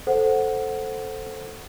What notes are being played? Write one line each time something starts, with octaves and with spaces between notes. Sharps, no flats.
A4 C5 F#5